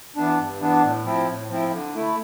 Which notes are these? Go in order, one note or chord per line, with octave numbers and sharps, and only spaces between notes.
E3 B3 D4
G2
E3 B3 D4
A2
F3 C4 E4
A2
F3 C4 E4
D3
A3 E4